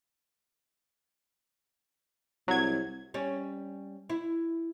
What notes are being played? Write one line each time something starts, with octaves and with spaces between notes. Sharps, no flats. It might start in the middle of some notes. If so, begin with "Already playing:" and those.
C2 F#3 G#6
G3 C#4
E4